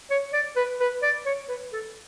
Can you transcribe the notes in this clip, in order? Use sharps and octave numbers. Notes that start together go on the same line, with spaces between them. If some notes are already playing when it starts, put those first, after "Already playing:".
C#5
D5
B4
B4
D5
C#5
B4
A4